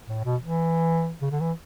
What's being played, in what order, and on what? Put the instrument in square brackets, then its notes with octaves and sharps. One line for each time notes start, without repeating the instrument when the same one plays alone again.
[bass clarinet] A2
B2
E3
C#3
D3
E3